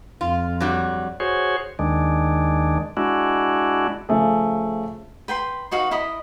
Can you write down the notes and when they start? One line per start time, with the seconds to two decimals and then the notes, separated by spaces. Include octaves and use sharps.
0.21 F2 F4
0.60 G2 F#3 G3
1.20 F#4 G#4 C5 C#5
1.79 D#2 D#3 G#3 D4
2.97 G#3 D4 E4 F#4
4.09 C#3 F3 A3 G#4
5.28 B4 G5 B5 C6
5.71 D#4 F#4 B4 F5
5.91 E4 A#4 D#5 B5